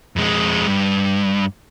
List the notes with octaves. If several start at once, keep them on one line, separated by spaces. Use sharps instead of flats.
F2 G#3
G2